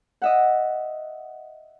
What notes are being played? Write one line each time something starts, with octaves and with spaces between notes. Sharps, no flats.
D#5 E5 F#5